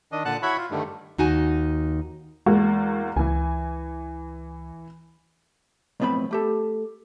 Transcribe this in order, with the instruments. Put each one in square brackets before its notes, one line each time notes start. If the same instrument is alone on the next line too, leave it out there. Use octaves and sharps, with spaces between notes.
[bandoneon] D#3 D4 D#5
A#2 D3 F#5 A5 F#6
E4 F#4 C#5 E5 F#5 B5
F4
G2 D3 D#3 G3 A3
[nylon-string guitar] D#2 D#4 F#4 G#5
[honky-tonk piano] E2 A#3 F#4 [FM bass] G#3
[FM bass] C#2 [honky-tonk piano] E3 G#5
[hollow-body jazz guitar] B1 F2 A2 B3 C4 B5
A3 G4 A4